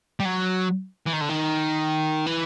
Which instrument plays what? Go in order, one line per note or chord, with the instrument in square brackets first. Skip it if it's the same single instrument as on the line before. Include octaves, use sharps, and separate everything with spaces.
[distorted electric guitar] G3
F#3
E3
D#3
D3
D#3
E3